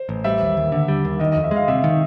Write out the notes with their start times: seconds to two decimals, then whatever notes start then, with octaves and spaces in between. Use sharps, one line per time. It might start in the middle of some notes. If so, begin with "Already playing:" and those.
Already playing: C5
0.09 A1
0.24 G3 E5
0.41 D#2
0.57 D#2
0.72 D3
0.88 G3
1.05 D#2
1.19 D#3 D#5
1.32 F2 D#5
1.44 E5
1.51 G#3 F5
1.68 C3 E5
1.84 D#3